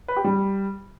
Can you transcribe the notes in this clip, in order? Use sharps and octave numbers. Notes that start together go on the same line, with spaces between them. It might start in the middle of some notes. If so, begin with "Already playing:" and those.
B4
G4
G3